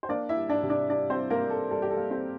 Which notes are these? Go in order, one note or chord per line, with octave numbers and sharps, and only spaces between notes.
C5
A#3 D4 D5
E4 E5
G3
D4 D5
C3
D4 D5
G3 D4 D5
C4 C5
G3
A#3 A#4
A#3
A4
G3 A4
G4
A4
A#3
C4 C5